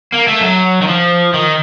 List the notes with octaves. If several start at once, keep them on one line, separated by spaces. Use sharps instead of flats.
A#3
A3
F#3
D#3
F3
D#3